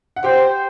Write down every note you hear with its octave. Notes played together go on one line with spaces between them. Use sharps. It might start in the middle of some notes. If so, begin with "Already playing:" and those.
F#5
G4 C5 G5